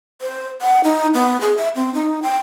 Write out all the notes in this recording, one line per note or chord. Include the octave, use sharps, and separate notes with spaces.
C5
F#5
D#4
B3
G#4
E5
C4
D#4
G5